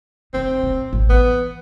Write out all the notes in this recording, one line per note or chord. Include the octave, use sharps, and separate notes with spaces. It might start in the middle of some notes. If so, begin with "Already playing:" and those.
F1 C4 D#4
A#1 C3
A1 D#2
E3 B3